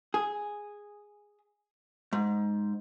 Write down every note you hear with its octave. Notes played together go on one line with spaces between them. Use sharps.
G#4
G#2